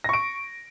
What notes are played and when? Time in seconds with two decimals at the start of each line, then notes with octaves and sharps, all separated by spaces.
0.04 A#6
0.09 C#6
0.13 D7